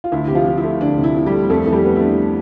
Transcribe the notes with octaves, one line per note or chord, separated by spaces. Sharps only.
F4
D2 E4
C3 G4
F3 F4
F3
E4
A3
D2 D4
C3
E4
F3
G3 G4
A3
F2 A3 A4
E3 A4
G3 G4
B3
D4 E4